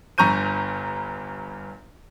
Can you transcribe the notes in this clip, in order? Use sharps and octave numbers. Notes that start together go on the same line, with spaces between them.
G1 G2 A#5 C#6 G6 D#7